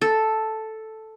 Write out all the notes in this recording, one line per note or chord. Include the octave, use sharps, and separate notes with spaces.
A4